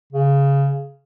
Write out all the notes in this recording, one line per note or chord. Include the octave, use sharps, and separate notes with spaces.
C#3